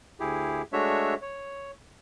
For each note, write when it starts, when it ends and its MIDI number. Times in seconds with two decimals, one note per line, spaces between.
0.20 0.62 38
0.20 0.62 64
0.20 0.62 67
0.20 0.62 68
0.73 1.14 56
0.73 1.14 57
0.73 1.14 62
0.73 1.14 66
0.73 1.14 73
0.73 1.14 76
1.22 1.71 73